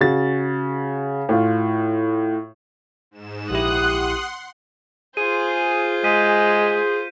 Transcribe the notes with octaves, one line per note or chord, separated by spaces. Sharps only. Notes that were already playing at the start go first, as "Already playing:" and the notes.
C#3 F#4 A6
A2 F4
G#2 E7
A#1 E4 G4 F#5 C6 D#6 F#6
F4 G#4 C5 D#7
G#3 G6 B6 D#7